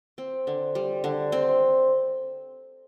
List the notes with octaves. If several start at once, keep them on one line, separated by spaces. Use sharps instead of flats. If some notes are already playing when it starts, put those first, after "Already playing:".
C4
D3
G3
D3
C4